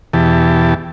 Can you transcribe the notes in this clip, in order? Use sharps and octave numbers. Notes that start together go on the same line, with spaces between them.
E2 B2 E3 G4 A5